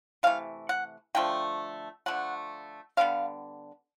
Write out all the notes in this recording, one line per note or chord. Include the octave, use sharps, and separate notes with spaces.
C3 E3 A3 F5
F#5
D3 F3 A3 G5
D3 F3 A3 F#5
D3 G3 B3 F5